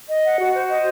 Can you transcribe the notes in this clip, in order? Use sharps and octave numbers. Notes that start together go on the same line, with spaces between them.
D#5
F#5
F#4
C5
D#5